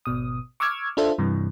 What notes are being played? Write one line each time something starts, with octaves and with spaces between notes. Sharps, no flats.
G#1 B2 D#6
C#6 D6 E6 F6 G#6
D4 F4 A4 C5 E5
G2 C3 E3